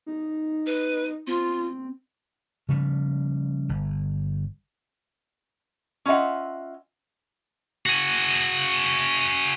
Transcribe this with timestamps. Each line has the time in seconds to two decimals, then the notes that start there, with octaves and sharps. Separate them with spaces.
0.06 D#4
0.66 B4
1.27 C4 F4
2.69 C#3 F3 G3
3.69 G1
6.06 C#4 F4 D#5 E5 F#5
7.86 F#4 G#4